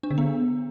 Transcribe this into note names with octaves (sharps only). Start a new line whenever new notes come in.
D4
D3
B3